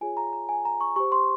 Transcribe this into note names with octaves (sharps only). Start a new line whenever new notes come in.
F4 G#4 C#5 G#5
A#5
A#5
G#5
A#5
C#6
G4 C5 C#6
C6